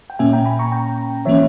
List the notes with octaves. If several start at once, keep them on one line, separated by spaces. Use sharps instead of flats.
G5
A#2 A#3 C#4 E5 G#5
G5 A#5
G#5 B5
A#5 C#6
G5 A#5
E3 A#3 C#4 C#5 E5